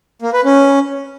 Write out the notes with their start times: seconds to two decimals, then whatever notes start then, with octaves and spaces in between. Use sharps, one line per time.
0.22 A#3
0.33 B4
0.44 C#4